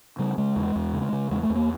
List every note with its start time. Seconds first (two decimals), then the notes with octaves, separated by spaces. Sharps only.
0.19 C#3 G3
0.38 C#3 G#3
0.56 E2
0.75 E2
0.93 C#3
1.13 C#3
1.30 E2 G#3
1.43 A3
1.50 E2
1.56 A#3